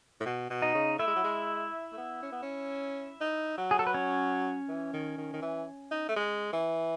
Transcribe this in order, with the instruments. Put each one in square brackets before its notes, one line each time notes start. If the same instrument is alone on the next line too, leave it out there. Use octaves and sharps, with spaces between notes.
[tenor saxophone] A2
B2
B2
[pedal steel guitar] D#4 D#5
[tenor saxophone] C#3
[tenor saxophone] A3 [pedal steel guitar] E4 E5
[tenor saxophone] G#3
F#3
G#3
A3
B3
C#4
B3
C#4
D#4
F#3
[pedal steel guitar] G#4
A4
B4
C#4 C#5
[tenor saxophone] E3
D#3
D#3
D#3
E3
D#4
A3
G#3
E3